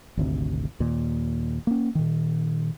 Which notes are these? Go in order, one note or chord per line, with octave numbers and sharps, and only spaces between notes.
G#1 D2 C3
D#2 A#2
A#3 C#4
A#2 D#3